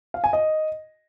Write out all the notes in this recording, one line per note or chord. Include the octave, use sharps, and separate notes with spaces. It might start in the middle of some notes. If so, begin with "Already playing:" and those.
F5
G#5
D#5